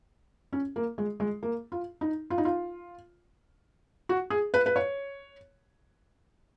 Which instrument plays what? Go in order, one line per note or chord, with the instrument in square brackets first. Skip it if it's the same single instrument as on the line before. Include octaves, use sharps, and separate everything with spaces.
[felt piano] C#4
A#3
G#3
G#3
A#3
F4
D#4
F4
D#4
F4
F#4
G#4
B4
B4
C#5